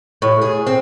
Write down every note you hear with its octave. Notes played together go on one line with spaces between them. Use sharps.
A2
G#4
C4